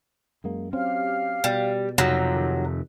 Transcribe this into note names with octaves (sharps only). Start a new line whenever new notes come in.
F#2 G#3 A#3
F#3 C4 C#4 G4 F5 F6
B2 G3
F2 C3 F#3 D#4 F4 G4
D#3